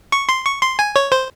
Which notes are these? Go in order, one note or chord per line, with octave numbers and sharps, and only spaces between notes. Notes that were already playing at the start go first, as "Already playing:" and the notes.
C#6
C6
C#6
C6
G#5
C#5
C5